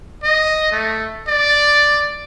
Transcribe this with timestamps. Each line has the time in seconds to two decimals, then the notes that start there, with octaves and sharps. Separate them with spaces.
0.24 D#5
0.72 A3
1.28 D5